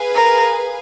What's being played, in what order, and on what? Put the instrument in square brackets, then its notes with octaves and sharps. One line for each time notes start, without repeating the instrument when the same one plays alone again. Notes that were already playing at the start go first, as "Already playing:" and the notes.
Already playing: [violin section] G#4 B4 F5 G#5
[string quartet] A#4